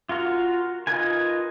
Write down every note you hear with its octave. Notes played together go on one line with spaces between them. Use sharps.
F4 F#4 A#4
D#4 F4 A#4 B4 G#5